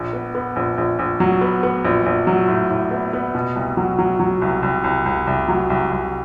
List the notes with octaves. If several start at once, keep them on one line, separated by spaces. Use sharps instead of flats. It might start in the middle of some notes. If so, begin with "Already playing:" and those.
Already playing: A#1
B3
B3
A#1
A#1
A#1
F#3
B3
B3
A#1
A#1
F#3
A2
A2
B3
B3
B2
C2
F#3
F#3
F#3
C2
C2
C2
C2
C2
F#3
C2
C2